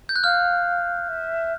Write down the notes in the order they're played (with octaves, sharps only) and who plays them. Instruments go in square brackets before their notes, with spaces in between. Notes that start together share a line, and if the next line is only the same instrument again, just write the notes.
[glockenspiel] G6
F#6
[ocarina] F5 [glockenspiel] F6
[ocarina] E5